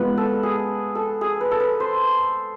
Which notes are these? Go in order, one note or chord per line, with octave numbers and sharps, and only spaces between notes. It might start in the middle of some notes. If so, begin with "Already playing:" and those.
Already playing: G#3 B3 F4 B4
A4
G#4
A4
G#4
B4
A4
B4
C5